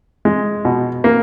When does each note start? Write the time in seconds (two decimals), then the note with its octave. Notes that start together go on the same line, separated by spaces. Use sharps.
0.25 G#3
0.65 B2
1.04 A#3